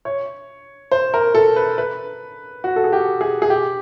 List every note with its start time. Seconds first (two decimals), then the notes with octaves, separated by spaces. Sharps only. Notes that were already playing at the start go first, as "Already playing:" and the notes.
0.05 C#5
0.91 C5
1.14 A#4
1.35 A4
1.56 B4
1.78 B4
2.64 F#4
2.76 A4
2.84 G#4
2.93 G4
3.21 G#4
3.42 G#4
3.50 G4